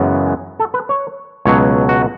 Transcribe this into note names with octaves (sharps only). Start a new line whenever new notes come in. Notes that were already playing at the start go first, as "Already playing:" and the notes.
Already playing: F#2 C#3 E3 G#3 B3
A4
B4
C#5
C#2 B2 F#3 C#5
F#4